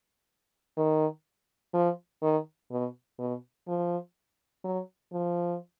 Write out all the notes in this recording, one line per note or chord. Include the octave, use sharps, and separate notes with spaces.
D#3
F3
D#3
B2
B2
F3
F#3
F3